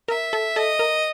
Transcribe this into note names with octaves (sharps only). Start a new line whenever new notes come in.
A#4 E5
A4
A4 D#5
A#4